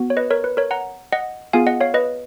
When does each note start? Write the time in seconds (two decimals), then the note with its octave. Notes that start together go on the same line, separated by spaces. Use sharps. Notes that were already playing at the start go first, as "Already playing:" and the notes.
Already playing: B3 F#4
0.10 C#5
0.17 B4 D#5
0.31 A#4 C#5
0.44 B4
0.57 A#4 C#5
0.71 F#5 A#5
1.12 D#5 F#5
1.53 B3 F4 G#4 F5 G#5
1.67 D#5 F#5
1.81 C#5 F5
1.94 B4 D#5